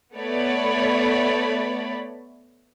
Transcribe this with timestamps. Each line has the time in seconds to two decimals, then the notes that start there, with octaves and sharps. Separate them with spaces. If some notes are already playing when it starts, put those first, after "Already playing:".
0.15 A3 B3 C#5 D5 B5